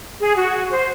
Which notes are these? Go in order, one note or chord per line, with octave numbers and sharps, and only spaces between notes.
G#4
F#4
C5